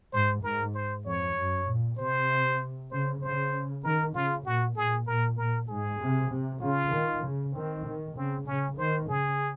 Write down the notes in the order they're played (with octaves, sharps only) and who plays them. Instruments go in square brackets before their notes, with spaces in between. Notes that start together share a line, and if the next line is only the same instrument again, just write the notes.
[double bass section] G#2 [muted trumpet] C5
[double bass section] G#2 [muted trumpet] A#4
[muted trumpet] C5
[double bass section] F2 [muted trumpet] C#5
[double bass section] F#2
A#2
[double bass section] C3 [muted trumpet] C5
[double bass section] C#3 [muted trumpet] C5
[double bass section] C#3 [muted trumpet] C5
[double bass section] D#3 [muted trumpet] A#4
[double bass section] C#3 [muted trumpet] F4
[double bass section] A#2 [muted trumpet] F#4
[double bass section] A#2 [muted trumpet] G#4
[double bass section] A#2 [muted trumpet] A#4
[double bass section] A#2 [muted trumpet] A#4
[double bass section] G#2 [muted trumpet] G#4
[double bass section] C3
C3
[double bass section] C#3 [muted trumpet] F4
[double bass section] D#3
C#3
[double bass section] D#3 [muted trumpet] C4
[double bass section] D#3
[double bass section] C#3 [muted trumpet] C4
[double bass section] C#3 [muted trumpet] C#4
[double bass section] D#3 [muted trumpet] C5
[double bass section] C#3 [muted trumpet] G#4